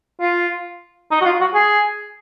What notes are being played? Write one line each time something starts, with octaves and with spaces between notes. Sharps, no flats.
F4
D#4
F#4
F4
F#4
G#4